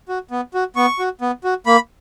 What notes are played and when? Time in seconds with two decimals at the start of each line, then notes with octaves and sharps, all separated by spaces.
0.09 F#4
0.31 B3
0.54 F#4
0.76 B3 C#6
0.99 F#4
1.21 B3
1.44 F#4
1.66 A#3 B5